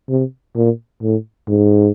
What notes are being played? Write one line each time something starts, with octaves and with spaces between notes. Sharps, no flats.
C3
A#2
A2
G#2